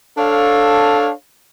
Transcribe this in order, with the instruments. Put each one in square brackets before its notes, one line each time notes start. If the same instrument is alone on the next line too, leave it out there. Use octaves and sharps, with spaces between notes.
[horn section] D4 A4 C#5 F5